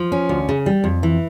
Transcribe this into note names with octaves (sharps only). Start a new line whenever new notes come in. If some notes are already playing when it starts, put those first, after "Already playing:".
Already playing: F3
C#4
D2
C#3
G3
F2
E3